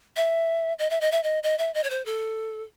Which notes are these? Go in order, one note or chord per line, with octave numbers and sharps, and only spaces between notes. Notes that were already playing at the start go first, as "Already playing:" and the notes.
E5
D#5
E5
D#5
E5
D#5
D#5
E5
D#5
C#5
C5
A4